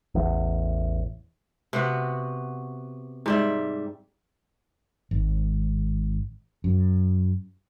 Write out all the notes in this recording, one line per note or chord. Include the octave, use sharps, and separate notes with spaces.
A1 E2
C3 B3 F#4
G#2 G3 E5
G#1
F#2